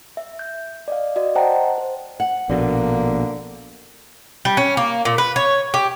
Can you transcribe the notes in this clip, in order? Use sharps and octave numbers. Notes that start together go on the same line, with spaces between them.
E5
G6
D5 D#5 F5
F#4 D5 D#5
C5 D#5 F#5 G5 A5 A#5
C5
F#5
A#1 B2 D3 A#3
G3
C#4
A#3
A#2
B4
C#5
G4